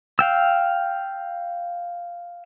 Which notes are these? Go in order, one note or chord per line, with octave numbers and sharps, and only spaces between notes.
F5 G5 E6